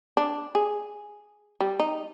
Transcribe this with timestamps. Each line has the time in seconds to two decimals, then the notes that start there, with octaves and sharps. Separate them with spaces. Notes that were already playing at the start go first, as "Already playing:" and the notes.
0.17 D4
0.55 G#4
1.60 G3
1.80 D#4